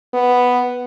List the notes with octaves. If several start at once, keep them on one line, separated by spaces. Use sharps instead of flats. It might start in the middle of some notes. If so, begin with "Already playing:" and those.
B3